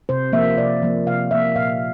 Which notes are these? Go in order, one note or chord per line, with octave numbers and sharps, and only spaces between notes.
C3 C5
F3 A#3 E5
C3 D5
F3 A#3
C3 F5
F3 A#3 E5
A#2 F5